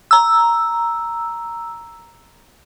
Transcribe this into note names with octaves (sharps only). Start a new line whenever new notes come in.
A#5 E6